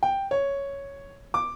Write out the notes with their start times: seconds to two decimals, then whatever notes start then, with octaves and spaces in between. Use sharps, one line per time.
0.03 G5
0.31 C#5
1.34 D6